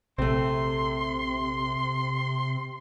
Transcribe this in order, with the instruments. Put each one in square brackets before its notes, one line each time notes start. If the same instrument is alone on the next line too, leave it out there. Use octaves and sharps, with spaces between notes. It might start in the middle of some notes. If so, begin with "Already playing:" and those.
[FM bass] A#1 [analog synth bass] C3 [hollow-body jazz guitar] A3 C4 [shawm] C6